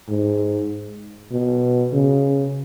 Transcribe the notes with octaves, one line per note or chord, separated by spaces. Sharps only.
G#2
B2
C#3